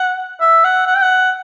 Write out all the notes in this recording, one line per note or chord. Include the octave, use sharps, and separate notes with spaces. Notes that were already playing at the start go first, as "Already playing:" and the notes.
Already playing: F#5
E5
F#5
F#5
G5
F#5